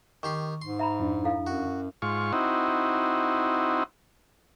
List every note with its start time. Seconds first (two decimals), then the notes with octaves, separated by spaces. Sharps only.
0.23 D#3 G4 C6 C#6
0.62 G#2 C6
0.79 E5 A#5 B5
1.00 F2 D4 E4
1.24 E4 A4 F5
1.47 F#2 F#4
2.02 G#2 F4 C#6
2.33 C4 D#4 E4 F#4